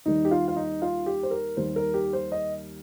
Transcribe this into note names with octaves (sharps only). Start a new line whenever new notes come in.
D#2 D#3 G3 D#4
G4
F4
F4
D#4
F4
G4
C5
A#4
D#2 D#3 G3 C5
A#4
G4
C5
D#5